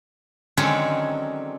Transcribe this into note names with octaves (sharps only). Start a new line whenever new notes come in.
D3 D#3 F#3 G#3 C4 C#4